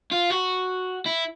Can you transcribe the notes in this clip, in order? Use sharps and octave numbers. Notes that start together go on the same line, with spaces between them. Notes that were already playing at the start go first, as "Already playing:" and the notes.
F4
F#4
E4